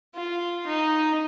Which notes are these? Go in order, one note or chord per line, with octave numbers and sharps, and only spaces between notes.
F4
D#4